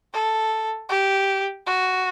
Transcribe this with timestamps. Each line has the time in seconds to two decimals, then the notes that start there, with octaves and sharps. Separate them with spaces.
0.13 A4
0.90 G4
1.66 F#4